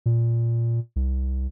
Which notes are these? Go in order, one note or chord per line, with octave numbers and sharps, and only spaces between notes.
A#2
C2